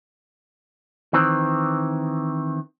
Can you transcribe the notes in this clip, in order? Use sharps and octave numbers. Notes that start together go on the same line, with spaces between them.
D#3 E3 C4